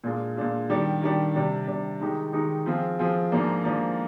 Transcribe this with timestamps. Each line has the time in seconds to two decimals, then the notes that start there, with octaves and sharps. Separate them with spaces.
0.04 A#2 G#3 D4 F4
0.37 A#2 G#3 D4 F4
0.70 D#3 G3 D4 G4
1.02 D#3 G3 D4 G4
1.35 C3 G3 D4
1.67 C3 G3 D4
2.00 D#3 G#3 D#4 G4
2.33 D#3 G#3 D#4 G4
2.66 F3 C4 F4 G#4
2.99 F3 C4 F4 G#4
3.32 G#2 F3 A#3 D4
3.64 G#2 F3 A#3 D4